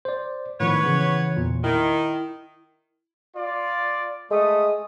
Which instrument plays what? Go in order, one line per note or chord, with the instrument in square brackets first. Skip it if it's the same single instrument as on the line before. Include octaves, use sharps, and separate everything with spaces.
[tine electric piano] C5 D5
[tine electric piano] A2 D#3 F3 [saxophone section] B3 B4 C#5
[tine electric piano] C#3 E3
E2 A#2
[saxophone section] D#3 [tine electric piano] E4
[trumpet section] F4 D5
[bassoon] G#3 [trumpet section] A3 D#6